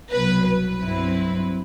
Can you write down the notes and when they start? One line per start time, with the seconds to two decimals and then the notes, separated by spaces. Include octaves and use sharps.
0.11 C2 B2 F#3 B4
0.46 B4
0.80 G2 F#3 C4 E4